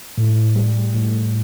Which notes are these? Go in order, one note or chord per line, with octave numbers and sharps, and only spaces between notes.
A2
G3
A2